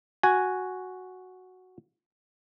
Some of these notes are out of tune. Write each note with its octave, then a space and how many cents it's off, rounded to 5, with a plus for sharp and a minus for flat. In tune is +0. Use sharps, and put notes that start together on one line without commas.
F#4 +0 G#5 +0